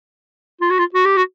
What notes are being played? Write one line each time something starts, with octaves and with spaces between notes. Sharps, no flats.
F4
F#4
F4
F#4
G4
F#4